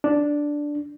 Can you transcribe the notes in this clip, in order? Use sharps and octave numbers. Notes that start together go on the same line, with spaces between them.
D4